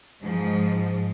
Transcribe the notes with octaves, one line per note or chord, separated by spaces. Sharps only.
G#2 F3